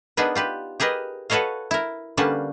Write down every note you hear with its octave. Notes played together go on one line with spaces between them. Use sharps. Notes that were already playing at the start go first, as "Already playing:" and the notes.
B3 D4 D#4 G#4 A#4 B4
F4 G4 B4
G4 G#4 A#4 B4 D#5
F#4 A4 B4 C#5 D#5 F5
E4 A#4
D3 G3 A#3 C#4 B4 A5